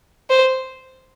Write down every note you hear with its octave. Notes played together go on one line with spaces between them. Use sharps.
C5